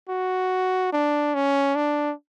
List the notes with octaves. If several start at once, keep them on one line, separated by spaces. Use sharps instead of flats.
F#4
D4
C#4
D4